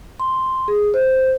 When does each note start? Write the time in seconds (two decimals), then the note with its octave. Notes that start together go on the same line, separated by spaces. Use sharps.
0.20 C6
0.68 G#4
0.94 C5